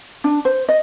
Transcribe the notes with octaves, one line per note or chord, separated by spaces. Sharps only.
D4
C5
D#5